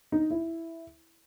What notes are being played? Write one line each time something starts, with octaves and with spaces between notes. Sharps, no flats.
D#4
E4